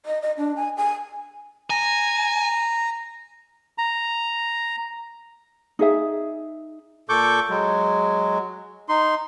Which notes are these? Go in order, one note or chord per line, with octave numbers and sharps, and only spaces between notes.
D#5
D#5
D4
G#5
G#5
G#5 A#5
A#5
D#4 G#4 E5
A#2 A4 C#6 D6 G6
F#3 G#3
D#4 C6